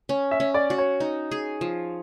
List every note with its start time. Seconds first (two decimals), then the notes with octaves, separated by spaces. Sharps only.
0.09 C#4
0.31 E5
0.40 C#4
0.54 D5
0.70 F#4
0.78 C#5
1.00 D#4
1.31 G#4
1.61 F3